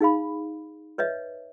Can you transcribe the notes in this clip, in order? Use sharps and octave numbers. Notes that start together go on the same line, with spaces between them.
D#4 G#4 F5 B5
B4 C#5 D#5 E5